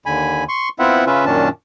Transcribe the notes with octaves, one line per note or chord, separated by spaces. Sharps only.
D#2 D3 G#5 B5
C6 C#6
B3 C4 E4 F4 E5 F#5
C#3 C#4 F4 B4 E5
F#2 A#2 D#3 C#4 D4 A5